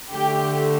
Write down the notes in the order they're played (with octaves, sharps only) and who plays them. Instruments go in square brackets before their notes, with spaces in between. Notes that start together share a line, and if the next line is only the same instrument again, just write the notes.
[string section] D3 A3 G4